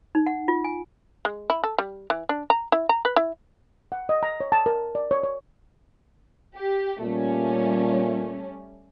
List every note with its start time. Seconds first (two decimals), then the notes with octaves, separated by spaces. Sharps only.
0.15 D#4
0.26 F#5
0.48 F4
0.64 G#5
1.25 G#3
1.50 E4
1.64 A4
1.78 G3
2.10 E3
2.29 D4
2.50 A#5
2.72 E4
2.89 A#5
3.05 B4
3.16 E4
3.92 F#5
4.09 D#5
4.23 A#5
4.40 C#5
4.52 A5
4.66 A#4
4.95 D5
5.11 C#5
5.23 C#5
6.56 G4
7.01 A#2 G3 A3 C#4